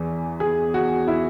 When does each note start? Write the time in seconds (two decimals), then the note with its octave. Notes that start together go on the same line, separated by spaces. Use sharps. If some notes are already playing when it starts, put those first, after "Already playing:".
Already playing: E2 E3
0.40 G#4
0.74 F#4
1.08 E4